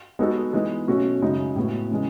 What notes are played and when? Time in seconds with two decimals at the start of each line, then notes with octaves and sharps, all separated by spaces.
0.19 G#3 B3 D#4 F#4 A4
0.53 E3 G#3 B3 D#4
0.87 B2 F#3 A3 C#4 F#4
1.22 F#2 C#3 G#3 D#4
1.56 A2 G#3 B3 F#4
1.91 C#3 E3 G#3